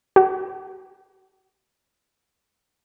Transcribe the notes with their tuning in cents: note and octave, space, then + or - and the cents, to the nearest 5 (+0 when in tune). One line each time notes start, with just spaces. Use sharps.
F#4 +40